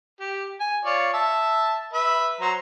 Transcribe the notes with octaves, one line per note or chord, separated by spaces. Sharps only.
G4
G#5
F4 C#5 D5
E5 A5
B4 E5 B5
F#3 C5 A#5